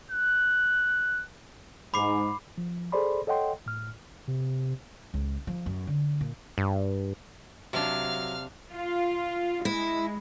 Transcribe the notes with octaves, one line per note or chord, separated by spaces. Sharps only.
F#6
G#2 B5 D6 C7
F3
G#4 A4 C5 D5 B5 C6
A4 C#5 D#5 F#5 G5 C6
A2 F6
C3
C#2
F3
F#2
D3
A#2
G2
C3 F#3 D4 F5 F6
F4
G#3 E4